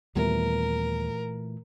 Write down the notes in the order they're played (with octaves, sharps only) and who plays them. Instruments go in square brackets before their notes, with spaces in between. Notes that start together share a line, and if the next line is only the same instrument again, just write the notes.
[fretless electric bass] D#2 G3 B3 [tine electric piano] A#2 E3 A3 [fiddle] A#4